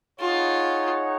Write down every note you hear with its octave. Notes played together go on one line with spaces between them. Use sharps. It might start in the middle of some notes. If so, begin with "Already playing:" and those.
D#4 F4 G#4 C#5 F#5